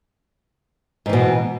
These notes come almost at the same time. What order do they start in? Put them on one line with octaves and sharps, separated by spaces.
G#2 E3 B2